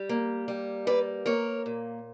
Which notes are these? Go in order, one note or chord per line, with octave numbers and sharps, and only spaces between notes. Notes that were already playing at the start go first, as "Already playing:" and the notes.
Already playing: G3
A#3
G3
A#3 B4 D5
A#3 A#4 C#5
A#2